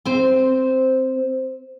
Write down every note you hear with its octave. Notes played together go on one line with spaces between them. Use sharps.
C4 C5